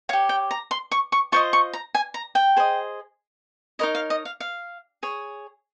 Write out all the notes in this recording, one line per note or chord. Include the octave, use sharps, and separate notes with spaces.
G4 C#5 F5
G5
A#5
C6
C#6
C#6
F4 C5 D#5 C#6
C#6
A#5
G#5
A#5
G5
G#4 C5 D#5
D#4 A#4 C#5 D#5
F5
D#5
F5
F5
G#4 C#5